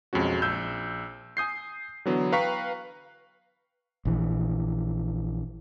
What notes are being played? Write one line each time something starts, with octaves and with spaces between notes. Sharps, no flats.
B1 F2 G#3 C#4 F#4
A#1 E6 G6
G#5 D#6 G6 C7
D3 E3 F#3 B3
B4 F5 G5 A#5 C#6 B6
A#1 E3